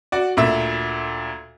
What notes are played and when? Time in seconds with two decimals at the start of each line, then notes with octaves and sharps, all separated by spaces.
0.12 F#4 D5
0.37 D2 A#2 E5